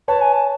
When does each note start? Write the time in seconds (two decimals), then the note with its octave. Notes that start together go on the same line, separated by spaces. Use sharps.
0.08 B4 C#5 A5
0.21 G#5
0.33 A5